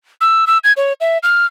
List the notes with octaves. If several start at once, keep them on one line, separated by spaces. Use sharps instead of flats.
E6
E6
G#6
C#5
E5
F6